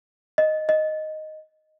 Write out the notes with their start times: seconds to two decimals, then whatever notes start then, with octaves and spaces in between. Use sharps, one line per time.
0.38 D#5
0.69 D#5